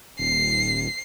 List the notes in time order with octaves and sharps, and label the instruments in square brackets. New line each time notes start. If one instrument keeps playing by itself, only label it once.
[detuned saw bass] D#1 [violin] C7